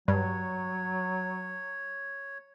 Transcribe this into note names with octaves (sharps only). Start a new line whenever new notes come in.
G2 F#3 C#5